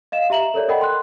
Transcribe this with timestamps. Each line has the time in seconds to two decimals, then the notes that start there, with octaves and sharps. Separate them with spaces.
0.12 D#5 F5 E7
0.30 G4 E5 A#5 F#7
0.54 A4 A#4 C#5 D5
0.68 A4 A#4 D#5 F#5 G5 B5
0.81 C6 F#6